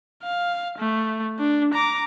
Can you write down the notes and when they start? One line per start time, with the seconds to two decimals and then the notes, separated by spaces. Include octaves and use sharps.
0.24 F5
0.78 A3
1.40 D4
1.74 A#5 D6